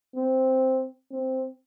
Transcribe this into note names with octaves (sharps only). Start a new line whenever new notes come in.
C4
C4